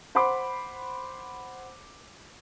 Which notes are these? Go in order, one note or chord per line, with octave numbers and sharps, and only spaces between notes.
C5 F#5 B5 C6 D6